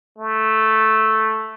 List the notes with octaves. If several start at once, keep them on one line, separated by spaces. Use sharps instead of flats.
A3